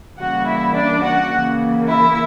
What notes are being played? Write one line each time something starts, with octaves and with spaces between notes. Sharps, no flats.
C#3 E3 G3 A#3 F#4 F#5
E4 E5
D4 D5
F#4 F#5
C#3 E3 A#3
E4 E5